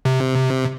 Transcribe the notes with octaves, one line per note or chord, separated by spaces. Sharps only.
C3